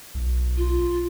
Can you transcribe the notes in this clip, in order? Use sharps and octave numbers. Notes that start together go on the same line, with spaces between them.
B1
F4